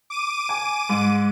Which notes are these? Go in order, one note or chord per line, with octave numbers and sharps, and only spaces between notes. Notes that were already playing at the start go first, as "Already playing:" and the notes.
D6 D#7
G#5
G#2